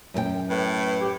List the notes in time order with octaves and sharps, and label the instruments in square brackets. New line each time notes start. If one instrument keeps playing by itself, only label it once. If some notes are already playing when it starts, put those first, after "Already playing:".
[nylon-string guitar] F#2 A#4 G5
[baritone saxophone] A2 [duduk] B4
[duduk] G4